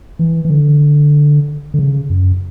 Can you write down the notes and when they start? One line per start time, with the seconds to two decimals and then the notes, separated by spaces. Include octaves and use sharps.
0.19 E3
0.45 E3
0.50 D3
1.74 D3
1.79 C#3
2.10 F#2